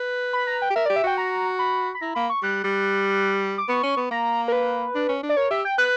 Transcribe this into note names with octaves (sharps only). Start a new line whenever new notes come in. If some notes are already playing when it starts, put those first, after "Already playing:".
Already playing: B4
B5
A#5
G5
G4
A#4 E5
D5
G4
E5
F#4 G5
A#5
B5
B5
E4 A#5
A#3 B5
C#6
G3 F#6
G3
D6
B3 C#6
C#4
B3
A#3 A#5
A#4
B4
D4
C#4
D4
D5
A#4 C#5
G4 E5
G5
B4 F#6